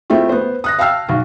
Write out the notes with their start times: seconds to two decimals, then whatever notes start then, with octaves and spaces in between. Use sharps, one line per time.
0.10 A3 C4 E4 F4
0.29 B3 C5
0.64 D#6 F#6 A#6
0.79 F5 G5 A5 E6 F6 C7
1.08 B1 F#4